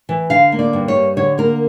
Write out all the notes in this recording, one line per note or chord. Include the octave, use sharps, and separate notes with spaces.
E3
D3 F5
A#3
D5
G2
C#5
G3
D3 C#5
A#3 A#4